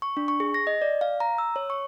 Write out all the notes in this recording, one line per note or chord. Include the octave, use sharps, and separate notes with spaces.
C#6
D4
C#6
G#4
A#6
D#5
D5
F5
A#5
E6
C#5
C#6